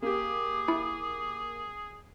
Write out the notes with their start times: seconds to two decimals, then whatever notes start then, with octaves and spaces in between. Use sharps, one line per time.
0.02 A#3 G4 G#4 D6
0.68 E4